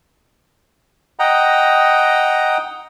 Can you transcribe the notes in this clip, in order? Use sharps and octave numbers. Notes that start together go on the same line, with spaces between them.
D#5 F#5 G5 A#5